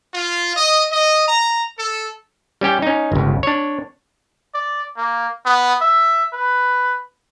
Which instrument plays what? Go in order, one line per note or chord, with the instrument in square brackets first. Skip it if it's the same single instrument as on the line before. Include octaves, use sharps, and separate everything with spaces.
[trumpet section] F4
D#5
D#5
A#5
A4
[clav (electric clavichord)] G3 C#4 G4 G5
C#4 D#4
G1 C#2
D4 C#5
[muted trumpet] D5
A#3
B3
E5
B4